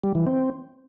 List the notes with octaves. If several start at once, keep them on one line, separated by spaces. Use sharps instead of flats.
G3
E3
C4